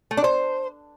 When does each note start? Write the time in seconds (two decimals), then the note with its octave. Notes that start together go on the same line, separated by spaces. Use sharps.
0.11 A3
0.17 D4
0.24 C5